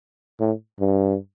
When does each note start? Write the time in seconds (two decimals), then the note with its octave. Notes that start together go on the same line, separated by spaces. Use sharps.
0.40 A2
0.80 G2